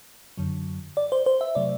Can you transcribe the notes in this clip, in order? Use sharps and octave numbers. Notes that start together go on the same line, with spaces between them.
F#2 D3 F#3
D5
C5
C5
E5
C3 F#3 A3 D5